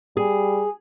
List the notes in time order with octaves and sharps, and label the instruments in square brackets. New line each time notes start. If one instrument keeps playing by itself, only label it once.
[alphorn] G3 [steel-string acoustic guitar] G#4